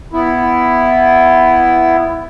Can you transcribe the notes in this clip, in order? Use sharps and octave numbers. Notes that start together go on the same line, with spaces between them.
B3 E4